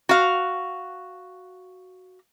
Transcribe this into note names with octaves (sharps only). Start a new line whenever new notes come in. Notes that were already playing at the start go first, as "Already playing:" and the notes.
F#4 F5